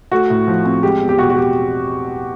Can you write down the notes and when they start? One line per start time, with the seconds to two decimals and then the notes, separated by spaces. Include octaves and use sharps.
0.12 A3 F#4
0.30 A2
0.47 F3
0.65 C4
0.83 G#3 G4
1.01 E2
1.09 G4
1.18 B2 F#4
1.30 F#4
1.37 G4